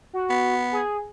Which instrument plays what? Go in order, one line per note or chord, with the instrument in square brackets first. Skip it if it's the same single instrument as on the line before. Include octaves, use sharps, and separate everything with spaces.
[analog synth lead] F#4
[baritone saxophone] B3
[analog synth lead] G#4